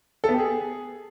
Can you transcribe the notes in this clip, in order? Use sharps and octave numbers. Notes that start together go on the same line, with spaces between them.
A4
B3
G4
G#4